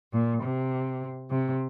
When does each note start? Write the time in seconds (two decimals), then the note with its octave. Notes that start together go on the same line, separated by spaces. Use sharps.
0.12 A#2
0.41 C3
1.30 C3